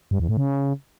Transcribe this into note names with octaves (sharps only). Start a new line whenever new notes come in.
G2
E2
A2
C#3